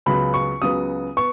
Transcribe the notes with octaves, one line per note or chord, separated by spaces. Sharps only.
C#2 C#3 F#3 B3 B5
C#6
C#2 C#3 F#3 B3 D#6
B3 C#6